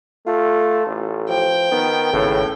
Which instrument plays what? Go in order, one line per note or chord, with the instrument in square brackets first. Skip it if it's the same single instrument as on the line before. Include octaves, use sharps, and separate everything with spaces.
[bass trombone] A3 [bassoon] F4
[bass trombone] A1
[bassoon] F3 [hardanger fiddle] G5
[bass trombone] D#3 [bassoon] B3
[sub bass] G#1 [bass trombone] A2 [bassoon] C#3